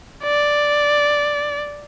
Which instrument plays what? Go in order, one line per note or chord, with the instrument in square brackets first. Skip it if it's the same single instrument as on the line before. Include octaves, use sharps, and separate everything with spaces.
[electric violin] D5